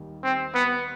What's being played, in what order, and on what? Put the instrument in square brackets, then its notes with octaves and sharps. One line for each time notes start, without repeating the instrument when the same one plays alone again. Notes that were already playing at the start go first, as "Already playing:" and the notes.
Already playing: [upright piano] D#2 D#3 G3
[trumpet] C4
B3